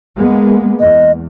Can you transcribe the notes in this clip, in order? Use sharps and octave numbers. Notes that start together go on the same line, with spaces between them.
G#3 A#3 B3
E2 D#5